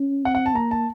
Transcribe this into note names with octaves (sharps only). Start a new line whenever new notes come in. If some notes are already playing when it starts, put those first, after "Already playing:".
Already playing: C#4
C4 F#5
F#5
A5
A#3 A#5
A5